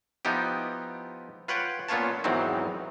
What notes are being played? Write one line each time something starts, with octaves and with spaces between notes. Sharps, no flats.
F3 B3 D#4 E4 G4
F4 B4 C#5 F#5 G5
A#2 B3 C#4 F4 C#5 A5
E2 G#2 D#3 E3 F#3 C4